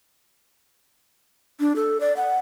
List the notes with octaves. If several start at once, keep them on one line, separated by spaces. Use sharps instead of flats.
D4
A4
D5
F#5